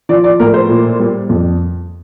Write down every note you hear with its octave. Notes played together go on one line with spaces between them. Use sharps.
F3 D5
D5
A2 A#4
C5
A#2
G3
F2